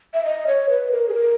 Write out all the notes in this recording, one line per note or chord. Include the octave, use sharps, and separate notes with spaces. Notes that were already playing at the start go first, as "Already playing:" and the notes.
E5
D#5
C#5
B4
A#4
G#4
A#4